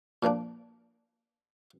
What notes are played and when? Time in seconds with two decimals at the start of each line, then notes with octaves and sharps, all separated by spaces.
0.23 A#2 F3 A#3 D4